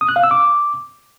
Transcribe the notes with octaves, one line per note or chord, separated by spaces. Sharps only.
D#6
F#6
F5
E6
D6